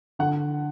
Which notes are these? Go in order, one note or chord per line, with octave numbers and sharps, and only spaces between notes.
D3 F#5